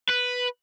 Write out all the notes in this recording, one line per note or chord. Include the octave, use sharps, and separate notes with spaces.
B4